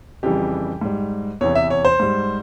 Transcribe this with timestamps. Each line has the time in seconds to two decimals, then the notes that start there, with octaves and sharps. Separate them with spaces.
0.23 F2 C#3 E3 G3 G4
0.81 G#2 G3
1.41 E2 C3 E3 C#5
1.55 E5
1.70 C#5
1.85 C5
2.00 G#2 G3